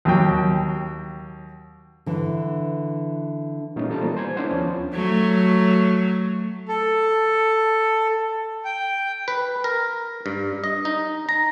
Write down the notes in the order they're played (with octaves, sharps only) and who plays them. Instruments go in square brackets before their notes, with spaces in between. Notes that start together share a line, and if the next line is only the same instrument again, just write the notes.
[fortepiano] D#2 F#3 G5
[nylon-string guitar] D3 E3
[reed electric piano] A#2 G3 B3 C#4 D#4 F4
G3 A4 G5 A5 A#5
E3 A#3 B3 B4 C5
C5 G#5 G#6
C#4 D4 E4 C5 F#5
D#2 F3 B3 C#4 B4 A5
[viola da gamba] F#3 A3
[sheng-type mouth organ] A4
G5
[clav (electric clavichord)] B4
A#4
G2
D#5
D#4
A#5